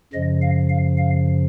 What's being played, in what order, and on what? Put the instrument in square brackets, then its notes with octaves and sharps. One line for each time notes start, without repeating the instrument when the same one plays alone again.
[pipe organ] F#2 C#3 F3 D#5
F5
F5
F5